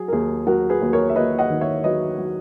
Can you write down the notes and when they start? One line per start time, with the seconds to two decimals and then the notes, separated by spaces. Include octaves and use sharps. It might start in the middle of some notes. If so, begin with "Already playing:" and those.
Already playing: F#3 G#4
0.08 A#4
0.12 D#2 G#4
0.47 F#3 F#4 A#4
0.69 G#4 B4
0.82 D#2
0.93 A#4 C#5
1.10 E5
1.16 D#2 B4 D#5
1.38 D#5 F#5
1.50 D#3
1.61 C#5 E5
1.84 F#3 B4 D#5
2.19 F#3